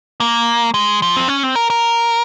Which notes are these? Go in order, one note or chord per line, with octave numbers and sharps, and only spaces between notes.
A#3
G#3
F3
C4
C#4
C4
A#4
A#4